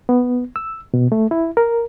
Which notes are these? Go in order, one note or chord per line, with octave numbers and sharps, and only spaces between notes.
B3
E6
B2
A3
E4
A#4